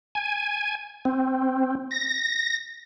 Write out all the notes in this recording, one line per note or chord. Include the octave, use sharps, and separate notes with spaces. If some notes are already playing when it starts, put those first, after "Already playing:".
G#5
C4
A#6